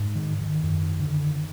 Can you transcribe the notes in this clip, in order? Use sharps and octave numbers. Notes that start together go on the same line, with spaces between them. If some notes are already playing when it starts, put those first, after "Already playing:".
Already playing: G#2
D#3
D#3
F#2
D3